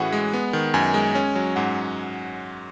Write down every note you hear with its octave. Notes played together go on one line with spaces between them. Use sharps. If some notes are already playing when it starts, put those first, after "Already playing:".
Already playing: A2 E3 C#4 E4 F#4 G#4 F#5
G#3
B3
D#3
F#2 G#5
G#3
C#4
F#3
G#2 F#5